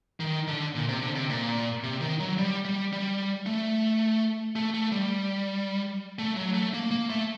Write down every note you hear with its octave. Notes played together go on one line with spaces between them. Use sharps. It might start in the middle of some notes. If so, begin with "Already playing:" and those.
D#3
D3
A#2
C3
D3
C3
A#2
C3
D#3
F#3
G3
G3
G3
A3
A3
A3
G3
A3
F#3
A3
A#3
A#3
A3